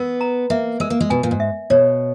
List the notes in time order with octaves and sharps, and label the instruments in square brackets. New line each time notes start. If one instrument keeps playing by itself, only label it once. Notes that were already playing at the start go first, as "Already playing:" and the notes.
Already playing: [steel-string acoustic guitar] B3 [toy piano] A#4
[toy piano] A#5
[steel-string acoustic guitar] A#3 [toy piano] E5
[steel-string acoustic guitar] G#3 [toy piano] A#4
[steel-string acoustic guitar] A#3
G#3
[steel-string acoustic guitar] B2 [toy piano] G#5
[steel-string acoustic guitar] A#2
G#2
[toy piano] E5
[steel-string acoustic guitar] B2 [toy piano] C#5